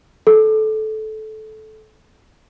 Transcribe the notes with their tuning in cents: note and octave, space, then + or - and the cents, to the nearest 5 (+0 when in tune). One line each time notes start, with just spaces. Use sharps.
A4 -15